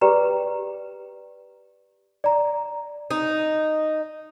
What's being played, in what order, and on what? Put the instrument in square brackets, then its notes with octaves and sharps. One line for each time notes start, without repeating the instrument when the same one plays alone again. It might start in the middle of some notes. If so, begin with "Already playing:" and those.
[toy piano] G4 G#4 B4 D5 G5 A#5
[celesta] D5 A#5
[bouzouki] D#4